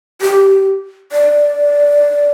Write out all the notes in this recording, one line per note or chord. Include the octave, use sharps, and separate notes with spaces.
G4
D5